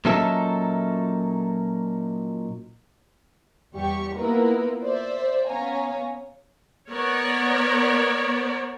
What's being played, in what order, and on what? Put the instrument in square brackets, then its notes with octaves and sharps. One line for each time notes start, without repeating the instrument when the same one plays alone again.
[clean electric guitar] A#2 F#3 C#4 D#4 A4 E5
[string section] E2 G3 G4 C#6
A#3 B3 E4 F4 A#4 B4
C5 D5 E5
B3 C#4 C#5 F5 G#5 A#5
[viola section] B3 A#4 C#5 D5